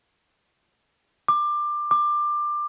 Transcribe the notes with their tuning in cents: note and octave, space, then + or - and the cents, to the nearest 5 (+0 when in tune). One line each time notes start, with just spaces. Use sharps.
D6 +20
D6 +20